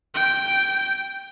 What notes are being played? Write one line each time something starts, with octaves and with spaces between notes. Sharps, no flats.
G5